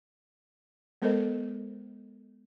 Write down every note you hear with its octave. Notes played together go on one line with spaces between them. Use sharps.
G#3 B3 A4 A#4 C5 D#5